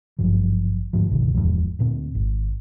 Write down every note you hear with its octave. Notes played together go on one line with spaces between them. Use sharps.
G#1 G2 F3 F#3
D2 G#2 F3
G1 C#2 B2 D#3
D1 E2 G#2 F3
D2 A#2 C4
G#1